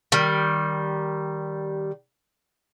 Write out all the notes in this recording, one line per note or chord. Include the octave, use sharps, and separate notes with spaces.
D#3 G3